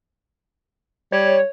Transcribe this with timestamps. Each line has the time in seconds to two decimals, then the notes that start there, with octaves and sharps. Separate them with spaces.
1.12 G3 C#5